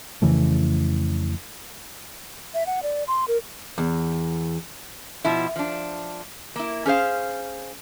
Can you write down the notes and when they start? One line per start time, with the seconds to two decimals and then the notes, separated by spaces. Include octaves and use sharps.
0.22 F2 C#3 E3 A3
2.54 E5
2.66 F#5
2.83 D5
3.08 C6
3.28 A#4
3.78 E2
5.25 B2 F3 E4
5.56 F3 D4
6.56 A#3 E4
6.86 C#4 G#4 C5 F5